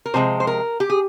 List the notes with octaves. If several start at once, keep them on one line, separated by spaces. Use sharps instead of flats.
A#4
C3 F3 G#3 C5
C5
A#4
G4
G#4